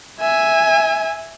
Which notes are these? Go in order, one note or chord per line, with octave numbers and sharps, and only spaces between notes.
E5 G#5